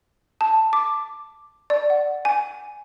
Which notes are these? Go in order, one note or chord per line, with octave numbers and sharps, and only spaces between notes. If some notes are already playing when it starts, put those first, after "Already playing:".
A5
D6
D5
F#5
G#5